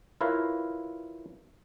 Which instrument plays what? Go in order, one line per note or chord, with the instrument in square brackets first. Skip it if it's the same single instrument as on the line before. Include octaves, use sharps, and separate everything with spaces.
[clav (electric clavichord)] E4 F4 A#4 B4 C#5 F5